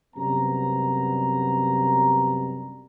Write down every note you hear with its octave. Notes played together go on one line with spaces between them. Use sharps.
F#2 C3 G3 B3 A#5